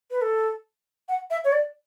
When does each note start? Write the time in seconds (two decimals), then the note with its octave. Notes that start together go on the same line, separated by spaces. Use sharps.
0.11 B4
0.21 A4
1.09 F#5
1.30 E5
1.44 C#5
1.52 D5